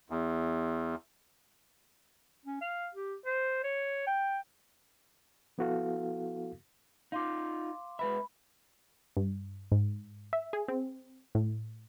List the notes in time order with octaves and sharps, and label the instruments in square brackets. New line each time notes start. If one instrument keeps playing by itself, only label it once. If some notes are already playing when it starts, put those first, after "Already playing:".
[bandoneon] E2
[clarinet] C#4
F5
G4
C5
C#5
G5
[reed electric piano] F3 B3 E4 F#4 A4 F5
[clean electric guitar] D#4 F4 [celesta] F5 C6 D6
[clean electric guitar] G#3 B4 E5 [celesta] B5
[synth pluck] G2
G#2
E5
G#4
C4
A2